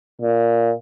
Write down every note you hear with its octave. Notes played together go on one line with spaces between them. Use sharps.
A#2